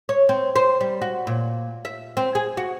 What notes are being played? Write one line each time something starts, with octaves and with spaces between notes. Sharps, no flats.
C#5
C4
C5
G3
F#4
A#2
E5
C4
G#4
F#4